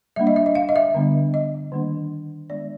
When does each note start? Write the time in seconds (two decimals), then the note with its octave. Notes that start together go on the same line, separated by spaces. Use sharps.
0.16 G3 A#3 D4 E5
0.27 D#5
0.36 E5
0.46 D#5
0.55 F5
0.69 D#5
0.76 E5
0.95 D3 G3 B3 D4
1.34 D#5
1.72 D#3 G3 A#3 D4
2.50 D#3 G#3 B3 D4 D5